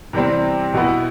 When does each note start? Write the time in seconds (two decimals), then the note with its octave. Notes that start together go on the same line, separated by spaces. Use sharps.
0.13 C3 E3 G3 C4
0.74 B2 B3 E4